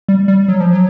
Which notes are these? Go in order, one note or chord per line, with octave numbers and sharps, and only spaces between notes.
G3
G3
F#3
F3
F#3